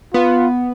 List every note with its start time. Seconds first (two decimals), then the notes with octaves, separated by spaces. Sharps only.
0.14 B3 F4